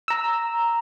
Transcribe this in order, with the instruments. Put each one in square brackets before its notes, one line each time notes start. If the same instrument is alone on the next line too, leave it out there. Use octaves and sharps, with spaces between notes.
[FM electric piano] A#5 E6